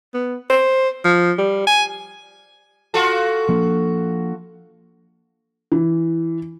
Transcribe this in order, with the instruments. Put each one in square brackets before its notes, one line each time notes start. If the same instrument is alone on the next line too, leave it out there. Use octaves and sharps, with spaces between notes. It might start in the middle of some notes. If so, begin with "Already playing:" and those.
[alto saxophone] B3
C5
F3
G3
G#5
[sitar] F4 F#4 A4
[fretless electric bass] F3 A#3 D4
[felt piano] E3